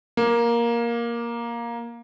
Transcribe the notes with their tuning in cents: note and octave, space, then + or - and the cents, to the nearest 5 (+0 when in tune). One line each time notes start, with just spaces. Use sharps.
A#3 +10